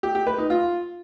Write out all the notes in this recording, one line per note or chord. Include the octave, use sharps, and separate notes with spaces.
G4
G4
B4
D#4
F4